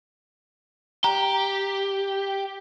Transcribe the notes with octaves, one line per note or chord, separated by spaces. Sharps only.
G4 A#5